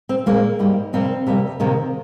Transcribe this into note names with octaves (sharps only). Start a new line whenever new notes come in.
C4
A#2 G#3 A#3
G#2 G3 A#3
F2 C3 G3 A#3 C4
F2 C3 G3 A#3
C3 D#3 A#3